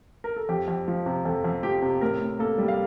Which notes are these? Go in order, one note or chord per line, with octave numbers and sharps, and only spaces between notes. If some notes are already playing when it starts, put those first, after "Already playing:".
A#4
A4
F2 G4
F2
F3
C3
F2 A4
F2
F3 G4
C3
A2 A#4
A2
A#3 A4
G3
F5